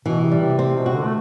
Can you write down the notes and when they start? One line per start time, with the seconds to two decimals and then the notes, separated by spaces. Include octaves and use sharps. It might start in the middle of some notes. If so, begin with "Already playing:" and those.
0.05 B2 E3
0.23 C3
0.31 G3
0.41 C3
0.58 C3 C4
0.77 B2
0.86 F#4
0.95 D3
1.05 A3